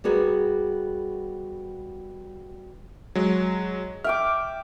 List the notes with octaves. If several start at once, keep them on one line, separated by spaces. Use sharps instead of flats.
G3 B3 F#4 G#4 A#4
F#3 G#3
E5 G5 D6 F6